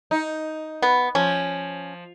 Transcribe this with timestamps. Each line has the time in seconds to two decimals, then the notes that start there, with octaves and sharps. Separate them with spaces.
0.11 D#4
0.82 B3
1.15 F3 C#4